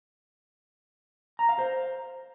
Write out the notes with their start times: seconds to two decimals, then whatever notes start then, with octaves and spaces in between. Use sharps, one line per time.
1.39 A#5
1.49 F5
1.59 C5